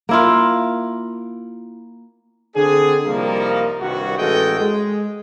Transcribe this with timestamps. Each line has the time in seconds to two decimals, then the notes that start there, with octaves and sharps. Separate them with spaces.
0.09 A#3 E4 F4
2.56 D3 C4 D4 G#4
3.06 C2 F3 G3 A#3 D#4 A#4
3.81 C2 G2 D#3 F#4
4.18 A1 G#3 F#4 A4 D#5 G5
4.60 G#3